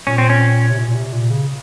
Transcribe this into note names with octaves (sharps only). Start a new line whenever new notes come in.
A#2 C#4
C4
C#4
C3
A#2
A#2
C3
A#2
C#3